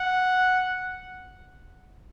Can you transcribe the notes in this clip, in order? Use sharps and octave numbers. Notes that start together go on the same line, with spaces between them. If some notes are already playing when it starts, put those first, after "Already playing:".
Already playing: F#5